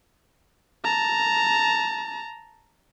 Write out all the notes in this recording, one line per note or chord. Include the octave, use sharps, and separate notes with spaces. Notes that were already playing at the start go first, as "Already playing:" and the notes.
A5 A#5